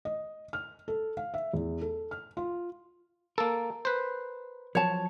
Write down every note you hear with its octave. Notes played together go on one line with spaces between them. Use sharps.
D#5
F6
A4
F5
E5
E2
A4
F6
F4
A#3 A4 A#4
B4 C5
F3 F#3 C#5 A5